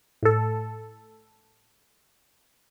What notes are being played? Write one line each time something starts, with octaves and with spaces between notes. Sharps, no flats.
A2 A4